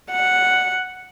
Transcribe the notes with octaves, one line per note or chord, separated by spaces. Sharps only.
F#5